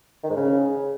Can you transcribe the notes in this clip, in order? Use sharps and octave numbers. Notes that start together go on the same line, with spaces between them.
D#3
G#2
C#3